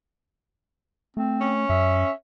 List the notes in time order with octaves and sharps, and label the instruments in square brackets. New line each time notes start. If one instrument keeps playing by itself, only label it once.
[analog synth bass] A3 [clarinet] C4
[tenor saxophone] C#4
[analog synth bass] F#2 [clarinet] E5